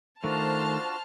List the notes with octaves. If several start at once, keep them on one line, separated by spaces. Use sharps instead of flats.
D#3 A3 D4 F4 F#4 C5 A5 F6